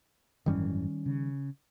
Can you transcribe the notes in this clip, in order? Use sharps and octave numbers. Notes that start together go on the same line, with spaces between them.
G#1 F#2 D#3 E3 G3 C#4
C#3